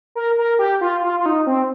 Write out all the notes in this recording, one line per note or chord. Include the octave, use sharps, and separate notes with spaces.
A#4
A#4
G4
F4
F4
F4
D#4
C4